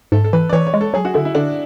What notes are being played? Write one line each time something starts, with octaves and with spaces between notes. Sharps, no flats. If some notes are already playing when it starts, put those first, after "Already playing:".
G#2 A4
A4
E3 B4
D5
E3 C#5
C#5
G#3
A4
F#3 G#4
F#4
D3 E4
E4
D3 D4